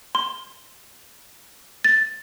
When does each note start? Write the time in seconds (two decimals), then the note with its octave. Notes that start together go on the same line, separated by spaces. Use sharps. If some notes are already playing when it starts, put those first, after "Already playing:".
0.15 C6
1.84 A6